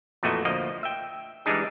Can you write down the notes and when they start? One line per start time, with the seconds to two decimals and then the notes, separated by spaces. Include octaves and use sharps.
0.23 F2 A#2 E3 A3 F#4 D#5
0.45 D2 F3 A#3 D#5
0.83 E5 G5
1.46 E3 G3 G#3 D4 D#4 G#4